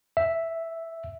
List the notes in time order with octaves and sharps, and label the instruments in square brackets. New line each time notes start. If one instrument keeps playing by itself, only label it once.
[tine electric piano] E5